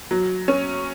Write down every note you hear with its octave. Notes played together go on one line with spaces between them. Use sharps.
F#3
C#4